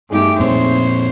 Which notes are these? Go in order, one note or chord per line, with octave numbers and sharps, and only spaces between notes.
G2 A3 D#4 G4 G#4
F2 A#2 C4 C5 C#5